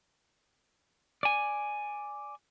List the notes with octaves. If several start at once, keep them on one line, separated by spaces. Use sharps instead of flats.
D5 G#5